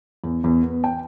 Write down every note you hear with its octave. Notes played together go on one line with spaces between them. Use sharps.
E2
E2
B3
G5